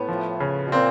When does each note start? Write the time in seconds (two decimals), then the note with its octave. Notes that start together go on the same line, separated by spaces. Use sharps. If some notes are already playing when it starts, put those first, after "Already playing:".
Already playing: A2 B3
0.08 F3
0.40 C#3
0.66 B2
0.72 A#2 C4